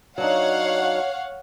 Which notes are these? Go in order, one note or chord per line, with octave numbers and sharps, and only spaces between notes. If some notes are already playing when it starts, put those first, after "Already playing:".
F#3 D4 D#4 C#5 F5 F#5